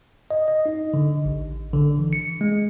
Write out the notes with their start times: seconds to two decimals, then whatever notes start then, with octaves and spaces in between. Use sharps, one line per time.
0.31 D#5
0.48 D#5
0.66 D#4
0.94 D3
1.25 A1
1.73 D3
1.99 E3
2.13 C#7
2.41 G#3